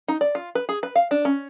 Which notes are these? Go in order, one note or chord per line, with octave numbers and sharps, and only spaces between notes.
D#4
D5
F4
B4
G#4
B4
F5
D4
C#4